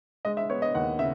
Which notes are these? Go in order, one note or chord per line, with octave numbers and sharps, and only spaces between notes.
G#3 D#5
E5
B3 C#5
D#5
D#2 F#5
C#3 E5